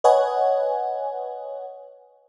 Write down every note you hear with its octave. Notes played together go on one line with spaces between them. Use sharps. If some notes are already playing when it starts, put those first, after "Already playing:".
B4 C#5 D#5 F#5 G#5